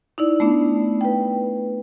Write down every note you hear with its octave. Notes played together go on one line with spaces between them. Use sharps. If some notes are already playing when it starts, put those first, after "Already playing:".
D#4 E4 D5
A3 B3 D4
B4 G5